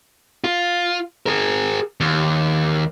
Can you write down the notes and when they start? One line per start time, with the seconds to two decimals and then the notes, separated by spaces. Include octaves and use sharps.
0.44 F4
1.26 G#4 A#4
2.00 D#2